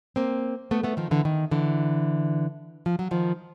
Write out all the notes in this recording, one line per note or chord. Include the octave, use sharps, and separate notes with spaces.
A#3 C4
A3 B3
A3 B3
D#3 F3
D3 E3
D#3
D3 E3
F3
F#3
D#3 F3